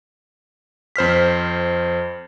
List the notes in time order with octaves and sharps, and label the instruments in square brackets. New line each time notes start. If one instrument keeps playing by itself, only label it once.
[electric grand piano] F2 C5 F6 B6